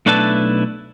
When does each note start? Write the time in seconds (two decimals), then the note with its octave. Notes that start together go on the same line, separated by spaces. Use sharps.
0.06 B1 A3 D4 E4 B4 A5